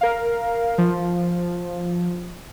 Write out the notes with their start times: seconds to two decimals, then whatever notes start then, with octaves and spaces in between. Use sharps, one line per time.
0.01 A#4 F5
0.78 F3